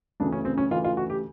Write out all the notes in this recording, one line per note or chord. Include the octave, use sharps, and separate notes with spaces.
D2 C#3 E3 D4
C#4
C4
C#4
D2 C#3 E3 F4
F4
F#4
G4